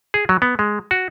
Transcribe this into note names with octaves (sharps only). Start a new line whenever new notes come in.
G#4
F#3
B3
G#3
F#4